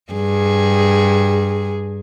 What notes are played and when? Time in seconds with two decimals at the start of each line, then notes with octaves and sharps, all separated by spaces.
0.12 G2 G#4